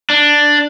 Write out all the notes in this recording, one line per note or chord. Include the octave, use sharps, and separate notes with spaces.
D4